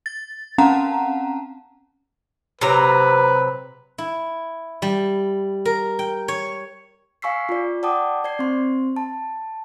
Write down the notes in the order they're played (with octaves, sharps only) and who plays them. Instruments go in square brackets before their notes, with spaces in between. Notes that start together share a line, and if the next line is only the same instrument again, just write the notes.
[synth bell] A6
C4 C#4 F5 F#5 A5 A#5
[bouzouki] C3 F#3 A#5 [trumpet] B4
[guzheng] E4
G3
A#4
G5
C#5
[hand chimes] F5 G#5 C#6 E6 B6 C7
F4 D5
D5 F#5 G5 A5 D6 D#6
D5 G#6 C7
C4 C6
A5